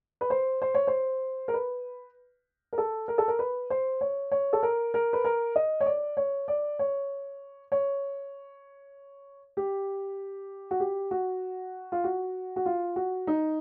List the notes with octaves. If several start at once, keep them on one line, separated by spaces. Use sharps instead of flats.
B4
C5
C5
C#5
C5
A#4
B4
A#4
A4
A#4
A4
A#4
B4
C5
C#5
C#5
A4
A#4
A#4
B4
A#4
D#5
C#5
D5
C#5
D5
C#5
C#5
G4
F#4
G4
F#4
F4
F#4
F#4
F4
F#4
D#4